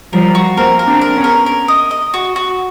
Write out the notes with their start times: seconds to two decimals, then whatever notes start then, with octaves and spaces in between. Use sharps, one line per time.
0.13 F3 G3 A#4
0.35 F#4
0.57 A#3 C4 A#4
0.79 A#4
0.87 C4 D4
1.01 A#4
1.16 B3 C#4
1.24 A#4
1.46 A#4
1.68 D#5
1.91 D#5
2.14 F#4
2.36 F#4